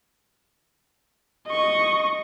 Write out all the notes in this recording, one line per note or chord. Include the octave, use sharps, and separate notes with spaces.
D#5 C#6